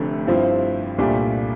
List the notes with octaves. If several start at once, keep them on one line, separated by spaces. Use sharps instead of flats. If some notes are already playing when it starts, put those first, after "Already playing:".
Already playing: F1 F2 D3 A3
G2 F3 C4 E4
C2 A#2 A3 D4 G4